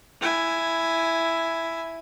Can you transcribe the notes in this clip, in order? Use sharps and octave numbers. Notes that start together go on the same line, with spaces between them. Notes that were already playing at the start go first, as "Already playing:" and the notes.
E4 G#5